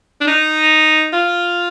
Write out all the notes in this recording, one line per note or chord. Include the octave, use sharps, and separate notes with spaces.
D4
D#4
F4